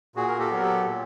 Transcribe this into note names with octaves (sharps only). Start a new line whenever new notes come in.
A#2 F#4 G#4
A#4
G4 A4
F#3 B3 A#4
G4 A4
A#2